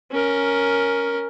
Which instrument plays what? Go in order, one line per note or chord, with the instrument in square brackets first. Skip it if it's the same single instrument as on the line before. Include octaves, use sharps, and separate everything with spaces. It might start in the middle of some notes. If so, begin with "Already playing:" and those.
[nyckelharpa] C#4 A#4